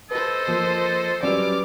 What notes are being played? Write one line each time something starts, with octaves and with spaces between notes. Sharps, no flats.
A4 B4 C5 D#5
F3 A#3
F#3 G3 C#4 B4 D5 D6 F6